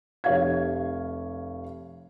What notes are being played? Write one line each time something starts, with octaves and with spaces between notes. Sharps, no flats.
F1 G4 C#5 F5 G#6